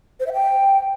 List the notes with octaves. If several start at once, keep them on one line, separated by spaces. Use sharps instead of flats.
C5
E5
G5